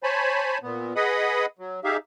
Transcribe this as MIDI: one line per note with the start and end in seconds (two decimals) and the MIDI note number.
0.03 0.58 72
0.03 0.58 73
0.03 0.58 80
0.03 0.58 81
0.03 0.58 83
0.63 0.93 46
0.63 0.93 59
0.96 1.46 68
0.96 1.46 71
0.96 1.46 75
0.96 1.46 78
0.96 1.46 83
0.96 1.46 87
1.59 1.80 54
1.84 1.97 63
1.84 1.97 67
1.84 1.97 68
1.84 1.97 76
1.84 1.97 77